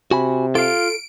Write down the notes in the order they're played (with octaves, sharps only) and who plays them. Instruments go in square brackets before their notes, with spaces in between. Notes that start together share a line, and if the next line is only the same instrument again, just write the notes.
[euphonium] C3 [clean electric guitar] F#4 G#5 B5
[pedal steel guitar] F4 F5 [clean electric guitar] A4 [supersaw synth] D7